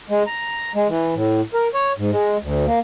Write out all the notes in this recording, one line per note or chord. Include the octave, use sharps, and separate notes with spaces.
G#3
A#5
G#3
E3
A2
A#4
C#5
G#2
G#3
D2
A#3